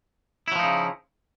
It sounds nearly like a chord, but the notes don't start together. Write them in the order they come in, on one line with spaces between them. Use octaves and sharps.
E4 F#3 F3 D#4 C#3